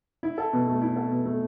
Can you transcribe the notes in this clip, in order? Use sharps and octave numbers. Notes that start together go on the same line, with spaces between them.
E4
A4
B2
A3
E4
A4
B2
A3